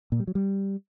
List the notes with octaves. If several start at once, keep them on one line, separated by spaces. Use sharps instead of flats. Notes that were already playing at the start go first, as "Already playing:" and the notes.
A#2
G3
F#3
G3